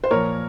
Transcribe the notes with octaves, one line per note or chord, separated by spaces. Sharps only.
C5
A#2 F3 A#4 C#5